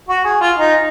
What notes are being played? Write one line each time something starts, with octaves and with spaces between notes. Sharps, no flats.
F#4
G#4
F4
D#4